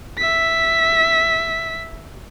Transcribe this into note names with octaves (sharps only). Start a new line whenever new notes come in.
E5 B6